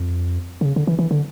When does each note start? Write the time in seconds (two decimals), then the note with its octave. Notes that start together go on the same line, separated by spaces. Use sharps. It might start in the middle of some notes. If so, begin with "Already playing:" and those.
Already playing: F2
0.61 D3
0.65 C#3
0.76 D3
0.87 E3
0.99 E3
1.11 D3